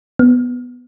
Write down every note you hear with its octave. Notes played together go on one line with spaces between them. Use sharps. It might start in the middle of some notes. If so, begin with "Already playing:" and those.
B3